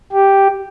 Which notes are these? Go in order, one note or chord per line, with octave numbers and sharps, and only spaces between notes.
G4